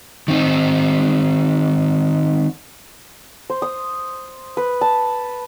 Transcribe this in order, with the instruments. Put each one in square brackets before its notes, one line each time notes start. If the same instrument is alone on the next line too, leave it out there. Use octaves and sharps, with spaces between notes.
[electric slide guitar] D#3 C4 D#4
[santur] C5
D#6
B4
A5